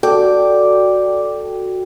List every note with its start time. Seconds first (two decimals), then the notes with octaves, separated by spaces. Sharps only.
0.03 F#4 A4 D5 G5